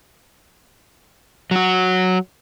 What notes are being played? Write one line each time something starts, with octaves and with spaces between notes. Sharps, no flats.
F#3 F#4